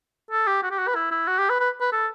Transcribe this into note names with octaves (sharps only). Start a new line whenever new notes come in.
A4
G4
F#4
G4
F#4
B4
E4
E4
F#4
G4
B4
B4
B4
A4